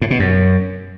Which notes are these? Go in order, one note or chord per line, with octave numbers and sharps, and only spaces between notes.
A2
B2
F#2